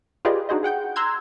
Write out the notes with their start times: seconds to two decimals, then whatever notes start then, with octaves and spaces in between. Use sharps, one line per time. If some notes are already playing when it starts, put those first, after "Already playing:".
0.25 F4 G4 G#4 B4 D5 D#5
0.49 D4 D#4 F#4 G#4 C5 D#5
0.63 G#4 F#5 G5 G6
0.96 A#5 C6 E6 F#6 G#6